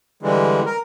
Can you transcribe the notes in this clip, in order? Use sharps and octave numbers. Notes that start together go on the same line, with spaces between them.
D3 E3 G3 G#3
A#4